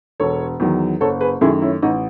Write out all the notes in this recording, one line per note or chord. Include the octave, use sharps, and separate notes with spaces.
E1 A4 C#5
E2 D#3 F#3
F#1 A4 C#5
G#4 B4
F#2 D#3 A3 E4 G#4
C#4 E4
A1 D#4